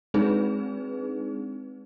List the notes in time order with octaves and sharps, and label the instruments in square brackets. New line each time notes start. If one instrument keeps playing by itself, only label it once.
[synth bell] G#3 C4 D4 D#4 G#4 B4